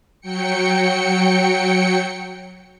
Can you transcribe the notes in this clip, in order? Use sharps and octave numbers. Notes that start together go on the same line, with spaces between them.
F#3 G5 C#7